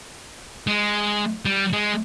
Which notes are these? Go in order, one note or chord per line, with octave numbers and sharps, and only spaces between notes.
G#3
G3
G#3